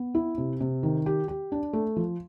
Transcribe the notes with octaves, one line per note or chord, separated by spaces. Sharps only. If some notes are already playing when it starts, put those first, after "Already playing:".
Already playing: B3
E4
C3
C3
D#3
G4
G4
D4
A3
F3